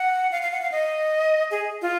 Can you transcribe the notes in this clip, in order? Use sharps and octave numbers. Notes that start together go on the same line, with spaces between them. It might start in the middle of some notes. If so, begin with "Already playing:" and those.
Already playing: F#5
F5
F5
F#5
F5
D#5
G#4
F4